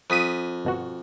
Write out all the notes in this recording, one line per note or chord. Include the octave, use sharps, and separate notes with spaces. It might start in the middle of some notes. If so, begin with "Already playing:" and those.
F2 D#6 B6 D#7
G1 B2 F#4